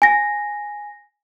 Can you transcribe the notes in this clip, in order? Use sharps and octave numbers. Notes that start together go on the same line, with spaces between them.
G#5 A#6